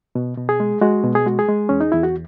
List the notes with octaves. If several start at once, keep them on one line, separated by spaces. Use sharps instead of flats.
B2
B2
G#4
G#3
G#3 F#4
B2
G#4
G#3 F#4
G#4
G#3
E2 C#4
D#4
E2 E4
F#4